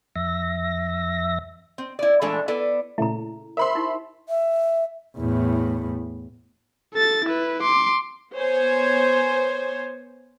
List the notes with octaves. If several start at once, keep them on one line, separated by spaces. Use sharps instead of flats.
F2 E5 A#6
C4
E4 D5
A#2 E3 G#3 A3 D4 A4
B3 E4 A4 D5
A#2 C#3 A3 E4 A#5
A#4 C5 E5 B5 C6
D#4 E4 G4
E5
E2 A2
A4 A6
E4 B4
C6 D6
B3 C5 C#5 G#5